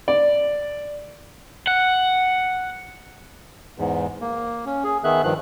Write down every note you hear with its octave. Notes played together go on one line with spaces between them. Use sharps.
D5
F#5
E2 G#2
A#3
C#4
G#4
D#3 B3 G#4 E5 F#6
G2 D#3 F3 F#6